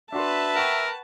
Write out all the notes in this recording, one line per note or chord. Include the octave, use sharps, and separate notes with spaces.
D4 F#4 B4 E5 A5 C6
A#4 F#5 G5 C#6